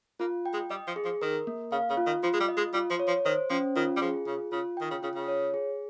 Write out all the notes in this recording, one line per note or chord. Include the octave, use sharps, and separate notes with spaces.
A#3 F4
G5
G#3
G3 D#5
F3
G#4
F3
D#3 A#4
A#3
C#3 F5
C#3
F4
D#3
F3 F4
G#3
G3
D#5
G#3
G3 F4
F3
C#5
F3
D#3 C5
F3 C#4
D#3 F4
G3
F3 G#4
C#3 F4
C#3 F4
D#3 G5
C#3
C#3 F4
C#3
C#5
G#4